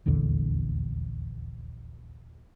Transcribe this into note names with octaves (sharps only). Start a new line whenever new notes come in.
D#1 A#1 E2 D3